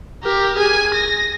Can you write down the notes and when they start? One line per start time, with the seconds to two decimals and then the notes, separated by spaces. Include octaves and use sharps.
0.23 G4 A#4
0.56 G#4 G#5
0.94 A#6